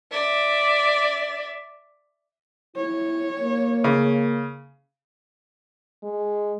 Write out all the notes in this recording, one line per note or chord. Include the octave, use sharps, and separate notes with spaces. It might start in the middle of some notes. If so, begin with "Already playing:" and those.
D5 E5
E4 C#5
A#3
C#3
G#3